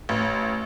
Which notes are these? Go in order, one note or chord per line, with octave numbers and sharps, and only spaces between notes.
A1